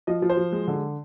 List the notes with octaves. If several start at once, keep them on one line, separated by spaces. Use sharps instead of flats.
F3 D#5
F3
C5
F3
G#3
D3